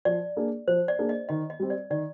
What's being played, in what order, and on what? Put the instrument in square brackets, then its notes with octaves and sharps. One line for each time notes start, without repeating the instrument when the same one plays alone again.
[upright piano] F3 [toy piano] D5
[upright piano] A#3 D4 G#4
[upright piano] F3 [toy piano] C5
[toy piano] D5
[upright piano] A#3 D4 G#4
[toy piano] D#5
[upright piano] D#3 [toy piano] D#5
[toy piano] D#5
[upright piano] G3 C4
[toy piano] D5
[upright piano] D#3 [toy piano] D5